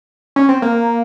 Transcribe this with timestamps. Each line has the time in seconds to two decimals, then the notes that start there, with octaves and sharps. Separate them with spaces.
0.36 C#4
0.49 C4
0.62 A#3